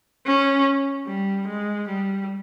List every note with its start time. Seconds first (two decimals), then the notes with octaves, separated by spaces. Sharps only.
0.26 C#4
1.07 G3
1.47 G#3
1.88 G3